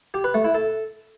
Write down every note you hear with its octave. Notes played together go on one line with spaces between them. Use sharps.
G4
B4
A3
E4
A4